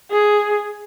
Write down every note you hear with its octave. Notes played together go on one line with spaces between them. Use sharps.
G#4